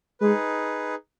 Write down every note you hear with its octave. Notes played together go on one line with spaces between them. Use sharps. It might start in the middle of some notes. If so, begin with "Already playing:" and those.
G#3 D#4 G#4 B4